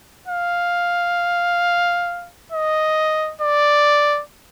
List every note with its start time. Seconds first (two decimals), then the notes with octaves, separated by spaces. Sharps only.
0.28 F5
2.52 D#5
3.41 D5